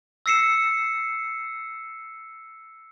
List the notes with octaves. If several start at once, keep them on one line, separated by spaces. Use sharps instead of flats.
E6 A#6 C7 C#7 E7